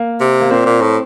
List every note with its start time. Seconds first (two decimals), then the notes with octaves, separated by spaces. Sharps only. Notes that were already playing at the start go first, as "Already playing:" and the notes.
Already playing: A#3
0.20 C3
0.41 A#3
0.51 A#2 C4
0.66 A#2
0.82 A2